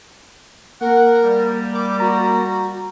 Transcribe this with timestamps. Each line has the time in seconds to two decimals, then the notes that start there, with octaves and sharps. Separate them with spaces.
0.81 A#3 A#4 F#5
1.23 G3
1.74 D6
2.00 F#4 A#5